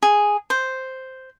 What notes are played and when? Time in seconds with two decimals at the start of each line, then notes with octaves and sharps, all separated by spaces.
0.03 G#4
0.50 C5